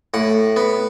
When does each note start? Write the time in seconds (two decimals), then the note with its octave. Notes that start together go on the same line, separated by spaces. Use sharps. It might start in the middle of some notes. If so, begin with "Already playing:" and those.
0.14 A2 F#5
0.56 B3